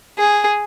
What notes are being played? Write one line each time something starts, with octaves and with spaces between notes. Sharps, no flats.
G#4